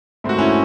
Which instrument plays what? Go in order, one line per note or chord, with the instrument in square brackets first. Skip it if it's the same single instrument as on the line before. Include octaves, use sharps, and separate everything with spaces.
[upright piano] G#2 D#3 A3 C4 [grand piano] F#4
[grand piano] C#4 E4